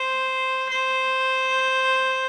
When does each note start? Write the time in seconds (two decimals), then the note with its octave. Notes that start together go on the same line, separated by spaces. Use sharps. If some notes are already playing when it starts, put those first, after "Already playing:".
Already playing: C5
0.69 C5